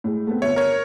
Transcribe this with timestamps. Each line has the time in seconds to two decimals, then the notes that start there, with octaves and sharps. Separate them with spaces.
0.04 A2 G#3
0.27 A3 B3 C4
0.42 G1 B3 C#5 E5
0.56 A#4 C#5